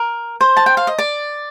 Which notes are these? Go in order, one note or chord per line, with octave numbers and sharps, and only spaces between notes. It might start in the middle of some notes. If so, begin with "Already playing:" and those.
Already playing: A#4
C5
A5
G5
F5
D#5
D5